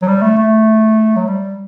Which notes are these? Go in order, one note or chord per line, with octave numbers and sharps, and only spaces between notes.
F#3
G3
A3
A3
F#3
G3